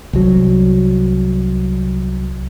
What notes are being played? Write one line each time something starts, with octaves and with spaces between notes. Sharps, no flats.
C2 F#3